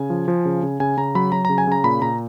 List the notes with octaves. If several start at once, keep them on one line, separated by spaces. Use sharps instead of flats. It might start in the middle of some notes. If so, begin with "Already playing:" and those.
Already playing: C#3 G#5
F3
F3
C#3
C#3
C#3 G#5
C#3 A#5
F#3 B5
F#3 A#5
C#3 A#5
G#5
C#3 A#5
A#2 B5
A#2 A#5